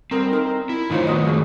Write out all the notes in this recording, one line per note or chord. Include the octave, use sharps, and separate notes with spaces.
G3 C4 A#4 A#5
D#4 A#4
E4
A2 D#3 D#4 F4 C5 C#5
B3 F#4 D#5
G#3